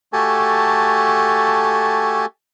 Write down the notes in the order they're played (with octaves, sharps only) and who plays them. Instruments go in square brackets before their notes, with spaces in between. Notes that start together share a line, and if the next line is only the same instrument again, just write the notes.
[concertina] A3 F#4 G4 A4 G#5 A5